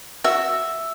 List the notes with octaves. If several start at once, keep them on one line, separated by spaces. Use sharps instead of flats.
F#4 E5